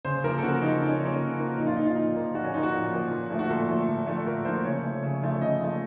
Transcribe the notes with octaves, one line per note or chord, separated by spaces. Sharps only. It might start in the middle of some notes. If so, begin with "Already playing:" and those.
C#3 C5
F3 A#3 A#4
A4
C#3 F#4
F3 A#3 D#4
C#3 D#4
C#4
F3 A#3 C#4
C#3
F3 A#3
A#2 D#4
F4
F3 A#3 D#4
F4
A#2 D#4
F3 A#3
A#2 F#4
C#4
F3 A#3 D#4
F#4
A#2
F3 A#3
A#2
F3 A3
F#4
A#2 A4
F3 A3
A#2
F3 A3
A#2 A#4
F3 A3 C5
C#3 C#5
F3 A3
C#3
F3 A3
C#3 D#5
F3 A3